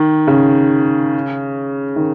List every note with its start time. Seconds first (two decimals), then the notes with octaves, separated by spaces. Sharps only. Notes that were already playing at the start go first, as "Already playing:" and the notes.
Already playing: D#3
0.27 C#3
1.96 D#3